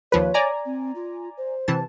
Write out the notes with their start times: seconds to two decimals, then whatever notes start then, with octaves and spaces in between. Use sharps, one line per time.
0.12 D#2 F3 B4 C#5
0.34 D5 G#5 A#5
0.65 C4
0.95 F4
1.37 C5
1.68 C3 E3 A5